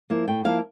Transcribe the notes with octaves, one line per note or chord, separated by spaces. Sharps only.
F3 A#3 E4
A2 G5
F3 A#3 E4 F5